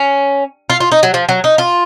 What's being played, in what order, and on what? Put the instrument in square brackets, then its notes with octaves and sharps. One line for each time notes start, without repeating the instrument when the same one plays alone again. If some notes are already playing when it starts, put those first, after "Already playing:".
Already playing: [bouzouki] C#4
F4
F4
D#4
F#3
F3
F#3
D#4
F4